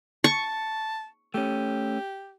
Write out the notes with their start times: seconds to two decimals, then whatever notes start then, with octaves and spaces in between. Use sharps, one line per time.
0.24 A5 C#6
1.34 A3 C#4 G4